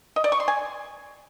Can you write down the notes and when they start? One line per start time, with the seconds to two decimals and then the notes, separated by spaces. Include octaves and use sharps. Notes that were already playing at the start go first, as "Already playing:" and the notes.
0.16 D#5
0.24 D5
0.32 C#6
0.40 C6
0.48 G#5